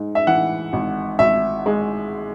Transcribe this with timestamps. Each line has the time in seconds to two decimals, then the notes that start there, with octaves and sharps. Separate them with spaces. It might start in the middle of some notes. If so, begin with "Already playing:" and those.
Already playing: G#2
0.15 E5
0.27 E3 F#5
0.73 G#1
1.19 G#1 E5
1.66 G#3